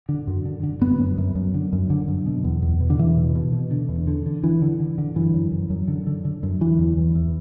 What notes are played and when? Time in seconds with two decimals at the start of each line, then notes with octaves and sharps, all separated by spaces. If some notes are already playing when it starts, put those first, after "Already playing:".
0.09 D3
0.27 F#2
0.46 D3
0.63 D3
0.81 F#2 B3
0.99 F#2
1.18 F#2
1.35 F#2
1.54 D3
1.73 F#2
1.90 D3
2.08 F#2
2.26 B2
2.44 E2
2.62 E2
2.81 B2
2.90 D3
2.98 E2 E3
3.17 B2
3.35 B2
3.53 B2
3.71 D3
3.89 E2
4.08 D3
4.26 D3
4.43 D3 E3
4.62 D3
4.80 D3
4.98 D3
5.16 F#2 E3
5.34 F#2
5.52 F#2
5.70 F#2
5.88 D3
6.07 D3
6.25 D3
6.43 F#2
6.60 E2 E3
6.79 E2
6.97 E2
7.15 E2